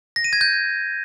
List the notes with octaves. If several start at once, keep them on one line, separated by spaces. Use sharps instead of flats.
A#6
D#7
G#6
G6